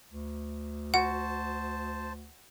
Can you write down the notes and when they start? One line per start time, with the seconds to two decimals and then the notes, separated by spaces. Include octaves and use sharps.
0.12 D2
0.94 F#4 C5 F#5 A5